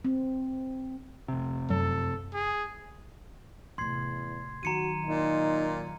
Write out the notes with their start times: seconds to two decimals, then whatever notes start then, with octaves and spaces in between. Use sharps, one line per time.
0.05 C4
1.28 F1 C3
1.70 F#2 A4
2.34 G#4
3.78 E2 A2 C3 C6 G#6 C7
4.63 D#3 F#3 F#4 A#5 C#7 D#7
5.05 A#2 D#4